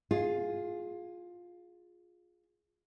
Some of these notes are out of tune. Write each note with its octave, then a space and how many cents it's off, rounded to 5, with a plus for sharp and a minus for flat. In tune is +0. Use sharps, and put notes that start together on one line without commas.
F4 +15 G#4 +0